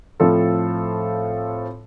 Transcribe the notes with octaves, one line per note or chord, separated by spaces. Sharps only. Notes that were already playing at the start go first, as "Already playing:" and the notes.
A2 F3 C4 F4 A4